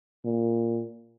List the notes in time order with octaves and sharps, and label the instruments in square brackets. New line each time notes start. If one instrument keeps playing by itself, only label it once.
[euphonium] A#2